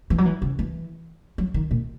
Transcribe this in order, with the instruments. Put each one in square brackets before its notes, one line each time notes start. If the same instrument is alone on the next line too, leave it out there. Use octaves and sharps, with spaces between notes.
[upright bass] E3
F#3
E3
C#3
E3
F#3
D#3
A#2